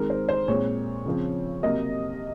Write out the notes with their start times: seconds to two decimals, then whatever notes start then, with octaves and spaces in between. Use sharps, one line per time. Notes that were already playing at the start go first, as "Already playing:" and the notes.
Already playing: D#3 G#3 C4 A#4
0.10 C5
0.29 C5
0.48 A#2 G#3 C4 C#5
1.06 C#3 F3 C4
1.63 C3 F#3 A#3 D#5